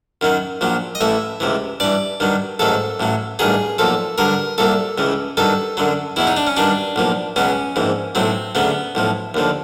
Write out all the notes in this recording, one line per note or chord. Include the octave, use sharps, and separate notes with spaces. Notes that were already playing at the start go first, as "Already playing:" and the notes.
F#2 D#3 F#3
A#1 A#2 F#3
D#5
A1 A2 E3 E5
C#2 C3 E3
G2 E3 D5
G2 D#3 F#3
A1 G#2 D#3 F#3 A4
A1 A2 F#3
A1 G2 D#3 F#3 G#4
B1 A#2 F3 A4
G2 D3 F#3 A#4
C2 A#2 F#3 A4
C#2 C#3 E3
G2 D#3 F#3 A4
F#2 D3 F#3
E2 B2 F#3 E4
D#4
D4
C#4
G2 D#3 F#3 D4
B1 A#2 F3
C#2 B2 F#3 C#4
A#1 G#2 E3
B1 A2 F#3 C4
D2 C#3 F#3 B3
B1 A2 F3
D#2 D3 F3